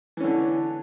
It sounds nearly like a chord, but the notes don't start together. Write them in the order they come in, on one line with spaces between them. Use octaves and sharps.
E3 C#4 D3